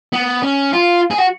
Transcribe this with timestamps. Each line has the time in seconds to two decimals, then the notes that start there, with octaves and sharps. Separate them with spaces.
0.13 B3
0.42 C#4
0.73 F4
1.11 G#4
1.18 F#4